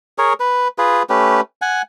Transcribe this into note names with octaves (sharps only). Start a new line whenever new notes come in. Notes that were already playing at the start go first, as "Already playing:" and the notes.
G#4 A#4 C#5
B4
F4 G#4 B4
A3 C#4 G4 B4
F#5 G#5